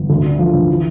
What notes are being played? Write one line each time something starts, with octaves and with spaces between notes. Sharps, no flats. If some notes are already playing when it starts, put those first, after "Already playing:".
Already playing: G1
D2
D3
F3
D2
E3